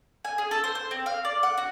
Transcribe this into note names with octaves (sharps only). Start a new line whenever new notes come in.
G#5
G#4
A4
C5
C5
C4
F5
D5
F#5
F#4